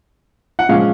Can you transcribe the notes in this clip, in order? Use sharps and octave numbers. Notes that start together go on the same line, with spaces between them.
F#5
A#2 F3 G#3 C#4 F5